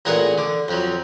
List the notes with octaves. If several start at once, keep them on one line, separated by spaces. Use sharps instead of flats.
A1 A#2 B3 G#4 A#4 F#5
D3 D6
F2 F3 F#3